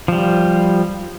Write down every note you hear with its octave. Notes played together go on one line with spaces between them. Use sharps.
F3 G3